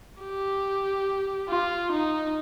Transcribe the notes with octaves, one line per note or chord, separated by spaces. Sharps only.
G4
F4
D#4